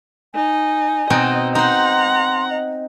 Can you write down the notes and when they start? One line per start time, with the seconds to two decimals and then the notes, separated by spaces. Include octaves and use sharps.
0.35 D#4 G#5
1.10 B2 C4 D#4 D#5
1.55 D#4 C5 F#5 A#5 C6
2.50 D#5